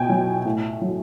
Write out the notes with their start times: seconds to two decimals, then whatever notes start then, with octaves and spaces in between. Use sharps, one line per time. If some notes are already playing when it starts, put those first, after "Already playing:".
Already playing: B2 G5 G#5
0.09 F#3
0.45 A2
0.82 F#3